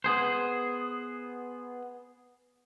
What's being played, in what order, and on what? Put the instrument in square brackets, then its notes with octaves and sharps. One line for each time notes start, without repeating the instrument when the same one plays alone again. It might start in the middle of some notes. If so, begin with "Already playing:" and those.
[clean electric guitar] B3 G#4 C5